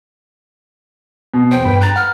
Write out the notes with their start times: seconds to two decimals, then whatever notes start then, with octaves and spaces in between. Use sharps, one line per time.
1.34 B2
1.51 E2 C5 G5
1.65 G2 B4 B5
1.81 A#5 F#6 A6
1.96 F#5 F6